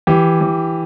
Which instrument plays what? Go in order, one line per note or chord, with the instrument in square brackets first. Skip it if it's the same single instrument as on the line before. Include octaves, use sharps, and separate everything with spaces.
[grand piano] E3 G4
E3